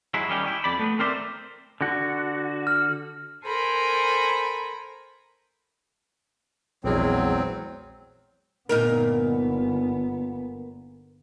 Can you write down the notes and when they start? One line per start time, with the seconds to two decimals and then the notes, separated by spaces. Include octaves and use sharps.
0.14 F#3 G#3 E4
0.29 D#3 G3 C#4 G4
0.46 E4 G5
0.64 F2 D5 B5
0.79 A3 B3
0.99 C4 A#4 C5 D5 E5
1.81 D3 F#4
2.67 F6
3.44 A4 A#4 C5 G#5 A#5 B5
6.84 A#1 E2 F#3 G#3 C4
8.69 G1 A#2 B3 D#4 A#4